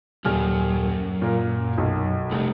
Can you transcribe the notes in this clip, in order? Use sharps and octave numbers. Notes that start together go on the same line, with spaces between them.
D#1 F#2 G#5 F6
A#2 A#4
B1
F1 C2